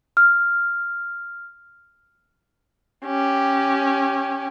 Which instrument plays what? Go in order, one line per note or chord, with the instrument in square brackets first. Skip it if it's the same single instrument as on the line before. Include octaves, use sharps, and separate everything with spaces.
[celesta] F6
[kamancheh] C#4 G4